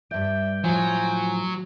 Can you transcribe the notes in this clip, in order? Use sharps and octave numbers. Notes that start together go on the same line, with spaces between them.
G2 D5 E5 G5
A2 F3 F#3 G#5